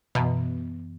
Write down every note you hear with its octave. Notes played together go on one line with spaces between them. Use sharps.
F#2 B2 E3 B3